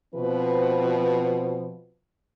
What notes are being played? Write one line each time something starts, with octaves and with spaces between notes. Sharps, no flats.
B2 F3 C4 B4